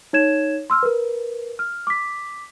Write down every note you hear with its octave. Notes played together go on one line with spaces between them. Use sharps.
D#4 C#5 G#6 E7
C6 E6 F6
A#4 B4
F6
D6 B6